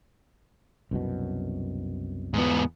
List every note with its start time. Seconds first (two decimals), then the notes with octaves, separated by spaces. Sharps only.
0.91 C2 F#2 B2
2.34 E2 G#2 B3